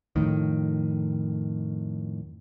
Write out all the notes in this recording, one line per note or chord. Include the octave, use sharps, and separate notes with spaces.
F2 A2 D#3